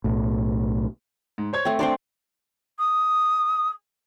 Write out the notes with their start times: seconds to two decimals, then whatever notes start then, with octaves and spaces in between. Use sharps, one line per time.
0.04 B1 A2
1.38 G#2
1.53 C5 C#5 G#6
1.65 A3 C4
1.79 C4 D4 C5 D5 C6
2.78 D#6